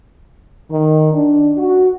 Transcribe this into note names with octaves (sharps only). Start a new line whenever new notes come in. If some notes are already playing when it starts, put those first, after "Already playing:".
D#3
D4
F#4